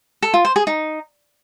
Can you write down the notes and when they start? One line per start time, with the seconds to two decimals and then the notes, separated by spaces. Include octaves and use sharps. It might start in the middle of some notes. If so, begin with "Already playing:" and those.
0.22 A4
0.34 F4
0.45 C5
0.56 G#4
0.67 D#4